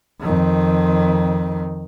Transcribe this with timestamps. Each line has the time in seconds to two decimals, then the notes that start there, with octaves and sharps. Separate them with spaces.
0.21 F2 D#3